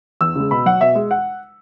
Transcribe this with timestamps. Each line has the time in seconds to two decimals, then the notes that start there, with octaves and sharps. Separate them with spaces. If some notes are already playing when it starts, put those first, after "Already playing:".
0.21 E2 E6
0.36 C#3 G#3
0.51 B2 B5
0.66 F#3 F#5
0.81 B2 E5
0.95 G#3
1.11 F#5